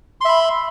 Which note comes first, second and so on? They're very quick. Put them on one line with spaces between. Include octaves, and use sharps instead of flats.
C6 E5 B5